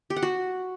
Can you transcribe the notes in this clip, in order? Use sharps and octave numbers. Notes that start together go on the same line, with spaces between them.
G4
F#5
F#4